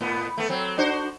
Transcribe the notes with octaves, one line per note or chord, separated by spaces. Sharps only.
A2 B3
A3 B3
F#3 C4
D4 F#4 C5